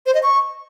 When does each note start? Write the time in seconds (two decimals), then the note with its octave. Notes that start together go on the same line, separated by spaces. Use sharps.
0.06 C5
0.14 D#5
0.23 C#6